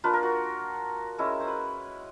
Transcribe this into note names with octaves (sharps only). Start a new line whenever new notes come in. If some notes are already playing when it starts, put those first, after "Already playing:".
A#3 D4 F4 B4
A#4
F#4
G#3 C#4 E4
C5
B4